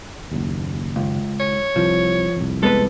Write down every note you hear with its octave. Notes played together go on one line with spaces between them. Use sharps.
F#1 D#2
C#2
C#5
C2 F3
C2 F2
G#3 B3 A4 B4